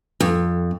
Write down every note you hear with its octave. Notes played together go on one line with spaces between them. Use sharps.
F2